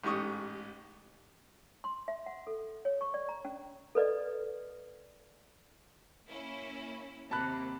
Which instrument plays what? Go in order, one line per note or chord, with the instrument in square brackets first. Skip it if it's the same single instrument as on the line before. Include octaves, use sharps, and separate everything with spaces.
[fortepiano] A1 G#2 G4 C#6 D#6
[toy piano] C6
E5
F#5
A4
C#5
C#6
D5
A#5
C#4
A4 B4 D5 D#5
[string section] A#3 C#4 E4
[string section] D#2 C3 A#3 [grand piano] A5 B5 F#6